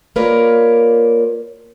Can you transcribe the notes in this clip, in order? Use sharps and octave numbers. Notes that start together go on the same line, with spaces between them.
A#3 F4 A#4 B4 C#5 D5